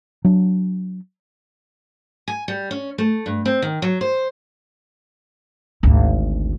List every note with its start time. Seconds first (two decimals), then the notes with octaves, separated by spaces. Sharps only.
0.25 F#3 D4
2.28 G#5
2.48 G3
2.71 C#4
2.98 A3
3.26 G2
3.45 C4
3.62 D#3
3.82 F#3
4.01 C5
5.83 G#1 D2